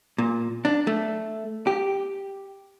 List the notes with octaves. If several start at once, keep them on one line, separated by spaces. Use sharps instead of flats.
A#2
D4
A3
G4